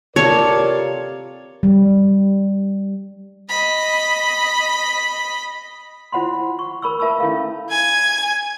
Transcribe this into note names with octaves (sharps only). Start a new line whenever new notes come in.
C3 F4 A4 A#4 C#5 D5
G3
D#5 B5
E4 F4 C5 F#5 B5 C6
C#6
A#4 B5 C#6 E6
A#4 B4 E5 A5 B5 E6
C#4 E4 A4 F5
G#5 G#6